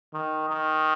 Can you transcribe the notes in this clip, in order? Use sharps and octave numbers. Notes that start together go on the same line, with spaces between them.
D#3
D#3